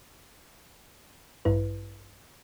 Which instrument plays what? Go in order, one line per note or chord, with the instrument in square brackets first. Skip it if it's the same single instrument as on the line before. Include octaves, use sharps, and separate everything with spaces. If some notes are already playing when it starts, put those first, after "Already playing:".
[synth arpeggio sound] A1 G2 E4 B4